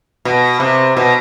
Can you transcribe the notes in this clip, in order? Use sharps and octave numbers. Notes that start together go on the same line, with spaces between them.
B2
C3
B2